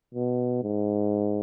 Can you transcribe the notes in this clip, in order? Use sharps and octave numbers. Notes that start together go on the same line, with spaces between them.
B2
G#2